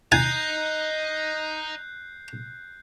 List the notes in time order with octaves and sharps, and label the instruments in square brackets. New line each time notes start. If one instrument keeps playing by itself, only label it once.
[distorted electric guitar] D#5 A#5 [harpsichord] G#5 [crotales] F#6 G6 C7